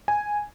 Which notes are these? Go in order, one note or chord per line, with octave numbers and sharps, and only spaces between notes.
G#5